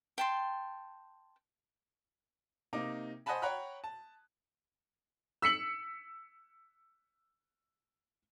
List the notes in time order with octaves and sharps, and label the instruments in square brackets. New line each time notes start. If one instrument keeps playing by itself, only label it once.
[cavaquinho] G5 A5 C6
[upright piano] C3 A#3 D#4 D6
C5 D#5 F#5 G#5 A5 B5
C#5 F#5 G5 A#5 B5 F#6
A5
E6 B6 C#7 F#7